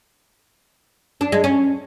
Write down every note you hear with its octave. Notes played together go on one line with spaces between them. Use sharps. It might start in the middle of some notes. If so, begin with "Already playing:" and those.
D4
G#3
C#4